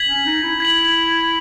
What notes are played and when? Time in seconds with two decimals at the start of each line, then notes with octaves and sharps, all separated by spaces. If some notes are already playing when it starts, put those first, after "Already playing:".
Already playing: G#6 B6 F#7
0.09 C#4
0.26 D#4
0.43 E4
0.60 G#6 B6 F#7